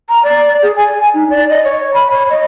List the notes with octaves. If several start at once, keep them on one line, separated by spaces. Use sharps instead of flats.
A#5
D5
G#4
G#5
D#4
D5
D#5
C#5
B5
C#5
D#5